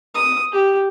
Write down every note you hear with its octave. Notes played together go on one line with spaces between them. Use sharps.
D#6
G4